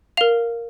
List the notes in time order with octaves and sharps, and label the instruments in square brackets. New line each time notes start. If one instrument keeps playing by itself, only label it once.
[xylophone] A#4 F5 F7